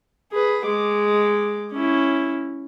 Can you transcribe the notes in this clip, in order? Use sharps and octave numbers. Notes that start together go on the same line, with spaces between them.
G#4 B4
G#3 D6
C#4 E4